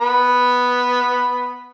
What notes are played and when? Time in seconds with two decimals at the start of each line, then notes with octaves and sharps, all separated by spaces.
0.01 B3 B5